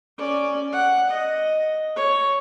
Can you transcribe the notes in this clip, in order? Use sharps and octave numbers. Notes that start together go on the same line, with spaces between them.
C#4 D5
F#5
D#5
C#5